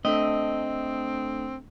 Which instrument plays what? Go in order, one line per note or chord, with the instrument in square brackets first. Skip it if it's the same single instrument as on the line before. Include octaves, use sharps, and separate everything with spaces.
[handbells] A3 D4 A4 [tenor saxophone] C4 [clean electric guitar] D#5